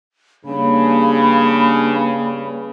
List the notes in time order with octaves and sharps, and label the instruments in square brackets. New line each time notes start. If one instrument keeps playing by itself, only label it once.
[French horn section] G2 C#3 [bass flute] A#3 [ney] B5